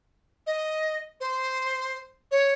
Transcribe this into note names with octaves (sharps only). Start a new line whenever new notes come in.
D#5
C5
C#5